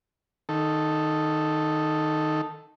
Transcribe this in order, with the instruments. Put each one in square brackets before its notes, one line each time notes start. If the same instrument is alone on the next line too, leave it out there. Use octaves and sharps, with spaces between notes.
[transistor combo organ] D#3 A4